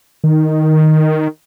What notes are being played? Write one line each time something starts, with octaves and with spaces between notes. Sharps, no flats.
D#3